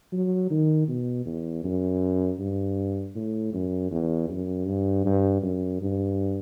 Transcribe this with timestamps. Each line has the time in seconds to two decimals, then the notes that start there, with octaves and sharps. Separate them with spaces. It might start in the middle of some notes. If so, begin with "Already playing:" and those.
0.12 F#3
0.50 D#3
0.88 B2
1.26 E2
1.64 F#2
2.40 G2
3.16 A2
3.53 F#2
3.91 E2
4.30 F#2
4.67 G2
5.05 G2
5.43 F#2
5.81 G2